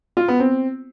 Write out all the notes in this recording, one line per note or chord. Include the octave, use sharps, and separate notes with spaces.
F4
B3
C4